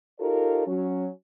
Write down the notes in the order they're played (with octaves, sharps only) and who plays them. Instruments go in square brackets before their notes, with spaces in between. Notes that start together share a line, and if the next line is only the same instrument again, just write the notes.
[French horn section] D#4 F4 G4 A4 A#4 C#5
F#3 C#4